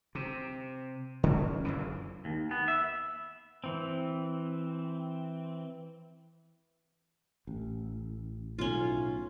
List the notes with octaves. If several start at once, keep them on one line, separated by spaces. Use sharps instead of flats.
C3
D3 C#4
F#1 F#2 E3
D#2
B3
E5
E3 C4
A1
B1 A2 C#4 F4